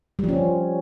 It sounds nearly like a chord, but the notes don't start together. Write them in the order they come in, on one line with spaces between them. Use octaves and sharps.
G3 F3 C#4